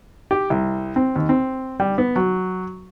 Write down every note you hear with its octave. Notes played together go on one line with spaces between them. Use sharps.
G4
C2
C4
D#2
C4
G3
B3
F#3